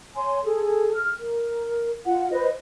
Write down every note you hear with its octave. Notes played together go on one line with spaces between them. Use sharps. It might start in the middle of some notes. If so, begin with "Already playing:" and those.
C#5 G#5 C6
G#4 A4
F6
A#4
F4 F#5
B4 C5 D#5